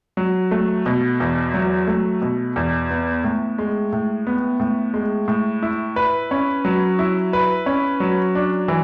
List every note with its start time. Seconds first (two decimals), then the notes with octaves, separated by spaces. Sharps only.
0.17 F#3
0.51 A3
0.86 B2
1.20 E2
1.54 F#3
1.87 A3
2.22 B2
2.56 E2
2.91 B3
3.24 A2
3.58 G#3
3.93 A2
4.27 B3
4.60 A2
4.94 G#3
5.28 A2
5.63 E4
5.96 B4
6.31 C#4
6.65 F#3
6.99 E4
7.33 B4
7.66 C#4
8.00 F#3
8.35 D4
8.68 E3